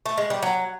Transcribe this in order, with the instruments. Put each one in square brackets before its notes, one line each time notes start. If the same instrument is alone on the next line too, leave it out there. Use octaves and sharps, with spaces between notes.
[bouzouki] A3
G#3
G3
F#3